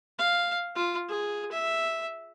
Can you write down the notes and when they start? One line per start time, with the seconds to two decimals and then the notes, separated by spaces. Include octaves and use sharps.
0.18 F5
0.76 F4
1.09 G#4
1.52 E5